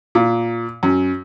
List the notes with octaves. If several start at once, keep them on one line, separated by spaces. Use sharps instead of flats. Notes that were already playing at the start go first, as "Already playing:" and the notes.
A#2
F#2